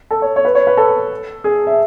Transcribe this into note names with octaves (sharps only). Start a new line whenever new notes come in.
A4
C#5
C#5
B4
C#5
B4
A4
G#4
E5